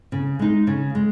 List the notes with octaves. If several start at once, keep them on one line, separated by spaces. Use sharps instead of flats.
C#3
G#3 D#4
C#3
G#3